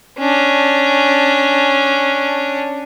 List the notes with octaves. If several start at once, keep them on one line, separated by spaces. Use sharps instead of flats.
C#4 D4